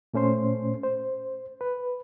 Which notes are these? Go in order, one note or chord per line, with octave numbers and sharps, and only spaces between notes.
A#2 A3 C#4 C5 C6
C5
B4